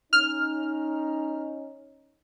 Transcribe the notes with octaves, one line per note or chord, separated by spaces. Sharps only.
C#4 D#4 F6